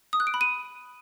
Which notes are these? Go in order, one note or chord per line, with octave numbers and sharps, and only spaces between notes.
D#6
F#6
D7
B5
D#7